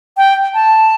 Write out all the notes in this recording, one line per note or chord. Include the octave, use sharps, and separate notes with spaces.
G5
A5